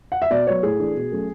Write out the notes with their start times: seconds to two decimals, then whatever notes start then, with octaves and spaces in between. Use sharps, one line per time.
0.12 F#5
0.22 E5
0.30 B2 D5
0.47 F#3 B3 C#5
0.63 A2 G#4
0.79 E3 A3 D4
0.96 B2
1.12 F#3 A3 C#4